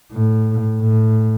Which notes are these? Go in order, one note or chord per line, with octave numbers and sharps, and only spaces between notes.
A2
A2